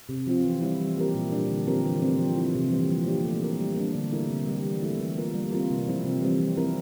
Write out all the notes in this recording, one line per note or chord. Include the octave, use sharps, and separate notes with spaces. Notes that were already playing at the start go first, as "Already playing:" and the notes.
C3
F3 C4 F4
E3
G3 C4 E4
E3
A#3 E4 G4 A#4
A#2
G3 D4
D3
F3 C4 G4 A#4
E3
A3 C4
F3
C4 E4
C3
E3 G3 A#3
F3
A#3 D4 G4
A3
E4 A#4
G3
A#3 D4
D3
A3 E4 A#4
C3
G3 C4 G4
E3
A3 E4
E3
A#3 F4 A#4
G3
C4 F4 A#4
C3
F3 C4 E4
C3
E3 G3 C4
F3
C4 E4 A#4